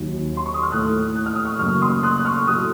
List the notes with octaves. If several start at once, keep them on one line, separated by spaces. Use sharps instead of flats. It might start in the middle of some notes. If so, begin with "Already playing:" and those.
Already playing: D#2 D#3 F#3
C6
C#6
D#6
F6
A2 A3 D#6 F#6
F#6
F6
D#6
C#6 F6
F#2 C#3 F#3 A#3 C#6 F6
C6 D#6
D#6 F#6
F#6
C#6 F6
A2 F#3 A3 D#6 F#6